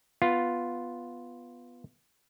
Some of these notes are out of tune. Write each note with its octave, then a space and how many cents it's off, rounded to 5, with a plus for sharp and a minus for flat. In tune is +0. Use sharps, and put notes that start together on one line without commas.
B3 +0 F4 +0